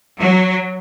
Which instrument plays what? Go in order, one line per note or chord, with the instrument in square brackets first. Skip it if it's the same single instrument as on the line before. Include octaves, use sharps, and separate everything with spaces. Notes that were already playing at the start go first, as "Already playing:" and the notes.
[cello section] F#3